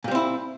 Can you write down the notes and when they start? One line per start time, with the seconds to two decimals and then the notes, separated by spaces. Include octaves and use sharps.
0.04 A#2
0.08 G3
0.11 C4
0.15 E4